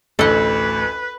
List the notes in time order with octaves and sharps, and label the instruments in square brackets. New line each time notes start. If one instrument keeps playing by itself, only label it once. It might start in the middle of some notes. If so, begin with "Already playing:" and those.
[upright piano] A1 D2 [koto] A4 D#5 [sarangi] B4